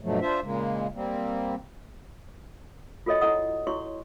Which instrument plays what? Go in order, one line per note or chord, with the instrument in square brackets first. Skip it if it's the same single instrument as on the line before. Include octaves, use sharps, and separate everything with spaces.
[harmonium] G2 B2 F3 F#3 A3
D4 F4 C5 E5
A#2 C#3 G#3 A#3
G3 A#3 C4
[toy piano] F4 F#4 A4 C#5 D#5 G5
E4 A4 D#5 F#5 D#6
E4 F#4 C#5 C6 C#6